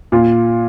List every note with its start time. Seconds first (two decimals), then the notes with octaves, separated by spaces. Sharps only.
0.12 A#2 F4